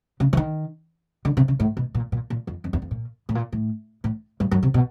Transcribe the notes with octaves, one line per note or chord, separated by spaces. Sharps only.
C#3
E3
D#3
D3
C3
C#3
A2
B2
A#2
A#2
A#2
F2
F2
E2
F2
A#2
A2
A#2
A2
A2
G2
F#2
C3
B2